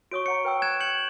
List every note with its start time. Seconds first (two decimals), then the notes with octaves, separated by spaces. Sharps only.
0.11 F#4 C#5 C#6 D#6 D7
0.26 C#5 F#5 A#5 C#7
0.45 B4 G5 E6
0.62 F#6 G#6 E7
0.80 G6 C#7 F#7